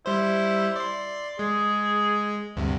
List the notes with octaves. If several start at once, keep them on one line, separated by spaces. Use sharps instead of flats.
G3 E4 C5
D5 C6
G#3 G#4
D2 G2 C3